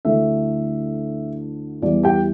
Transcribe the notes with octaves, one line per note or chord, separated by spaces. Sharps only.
D2 D3 A3 E4 E5
E2 E3 G3 D5
G4 G5